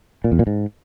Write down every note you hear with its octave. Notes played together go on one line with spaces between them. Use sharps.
A#2
E2
A#2
G#2